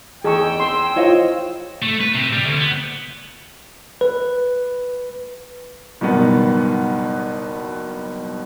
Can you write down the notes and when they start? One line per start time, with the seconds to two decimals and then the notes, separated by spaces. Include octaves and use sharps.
0.24 E2 G#4 D#5 G5 C#6 E6
0.60 C6
0.96 E4 F4 C5 C#5 D#5 F5
1.82 A3
2.01 B4
2.14 C3
2.33 G3
2.45 D2
2.60 B3
4.01 B4
6.01 F#1 G2 B2 D#3 B3 F#5